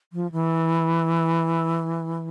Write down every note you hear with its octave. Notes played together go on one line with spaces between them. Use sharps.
F3
E3